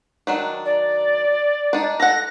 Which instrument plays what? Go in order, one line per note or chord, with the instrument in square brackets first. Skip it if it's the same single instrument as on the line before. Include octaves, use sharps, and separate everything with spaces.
[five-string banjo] D#3 F#3 D4
[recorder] D5
[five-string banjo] D4 D#4
[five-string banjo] A4 F#5 [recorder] A#6